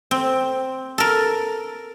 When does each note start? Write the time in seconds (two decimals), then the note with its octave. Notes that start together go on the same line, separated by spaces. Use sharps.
0.11 C4
0.98 A4 A#4